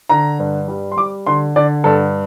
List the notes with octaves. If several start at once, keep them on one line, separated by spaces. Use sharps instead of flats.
D3 A#5
G2
G3
C6
G3 D6
D3 C6
D3 D5
G2 A4